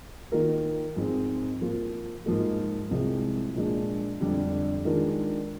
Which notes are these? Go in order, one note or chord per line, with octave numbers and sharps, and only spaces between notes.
D#3 A#3 F4 A#4
G#2 F3 G#3 C4
F3 A#3 F4
G#2 F3 A#3
C2 C3 F3 G#3
A#2 F3 G#3 D4
F2 D3 G3 D4
D#3 G#3 D4 F4 A#4